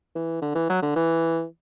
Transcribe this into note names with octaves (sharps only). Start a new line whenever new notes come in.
E3
D3
E3
F#3
D3
E3